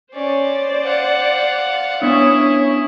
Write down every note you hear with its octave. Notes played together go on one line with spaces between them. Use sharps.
C#4 C5 D5
F5 F#5
B3 C#4 D4 E4 C#5 D#6